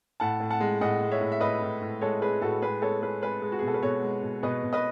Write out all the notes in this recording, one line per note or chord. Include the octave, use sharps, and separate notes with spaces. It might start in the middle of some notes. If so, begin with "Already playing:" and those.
A2 F#5 A5
A2
F#5 A5
G#3
A2 D#5 F#5
G#3
C#5 E5
A2
E5
A2 B4 D#5
A2
A2
G#3 A4 C#5
G#3 G#4 B4
A2 F#4 A4
G#3 G#4 B4
G#3 A4 C#5
G#3 G#4 B4
G#3 G#4 B4
G#3
F#4
G#4
B2
A4
B4
B2 A4 C#5
G#3
B2
B2 B4 D#5
B2
B4 D#5